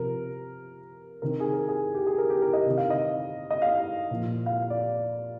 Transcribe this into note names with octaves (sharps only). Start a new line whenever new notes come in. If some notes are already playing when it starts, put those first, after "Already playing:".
Already playing: C3 F3 A#4
C3 D#3 A#4
G#4
A#4
G#4
G4
G#4
A#4
G4
A#4
D#5
C3 D#3
F5
D#5
D#5
F5
A#2 F3
F5
D5